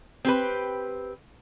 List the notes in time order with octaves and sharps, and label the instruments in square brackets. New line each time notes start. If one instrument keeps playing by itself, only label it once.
[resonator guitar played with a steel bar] C4 G4 B4